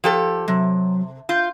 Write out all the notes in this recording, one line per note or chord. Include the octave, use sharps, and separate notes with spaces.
F3 G4 A4
C3 F#3
F4 G6